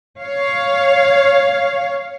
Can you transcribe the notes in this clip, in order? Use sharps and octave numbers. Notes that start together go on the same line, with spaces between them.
C#5 F5